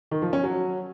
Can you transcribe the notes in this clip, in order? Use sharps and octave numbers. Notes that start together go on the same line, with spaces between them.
D#3
F3
C#4
F#3